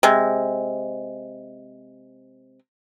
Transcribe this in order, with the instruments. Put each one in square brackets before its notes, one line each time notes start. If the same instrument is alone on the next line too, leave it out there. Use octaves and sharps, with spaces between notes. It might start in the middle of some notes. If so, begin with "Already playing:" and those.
[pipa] C3 G#3